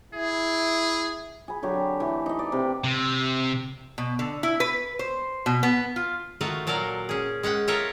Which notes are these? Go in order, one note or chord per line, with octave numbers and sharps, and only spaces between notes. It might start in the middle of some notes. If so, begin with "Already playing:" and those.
E4 G#4
G#4 B5
D3 F#3 G4 C#6
E3 A3
D#4 D#5
D5
C3 B4
C3
B2
D3
E4
B4
C5
B2
B3
F4
D#3 A3 F4 F#4
A#2 F#3 A4 A#4 D5 F5
C#4 G#4
G#3 C#4 F#5 G5
F4 A4 A#4 C#5 D#5 E5